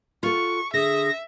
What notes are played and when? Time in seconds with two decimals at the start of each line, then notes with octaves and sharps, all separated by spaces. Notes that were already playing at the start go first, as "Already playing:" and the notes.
0.23 F4 F#4 A4 C#6
0.74 D3 G#4 E5 A#6